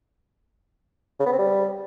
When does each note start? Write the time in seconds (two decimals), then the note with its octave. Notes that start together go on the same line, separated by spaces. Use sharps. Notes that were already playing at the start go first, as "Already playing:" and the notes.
1.20 C#3
1.26 B3
1.32 C4
1.38 G3